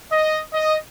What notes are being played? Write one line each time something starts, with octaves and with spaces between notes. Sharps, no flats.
D#5
D#5